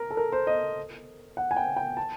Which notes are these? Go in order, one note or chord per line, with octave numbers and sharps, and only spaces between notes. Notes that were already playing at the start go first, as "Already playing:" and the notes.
Already playing: A#4
A4
A#4
C5
D#5
F#5
G#5
G5
G5
A5